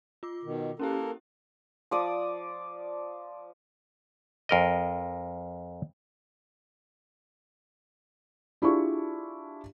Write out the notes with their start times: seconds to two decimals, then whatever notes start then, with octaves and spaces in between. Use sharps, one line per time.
0.23 F4 D6
0.43 B2 D#3
0.79 A#3 C#4 E4 G4 A4 A#4
1.91 F3 D5 D#6
4.49 F2 A#4 D#5
8.62 D4 E4 F4 G4 G#4 C#6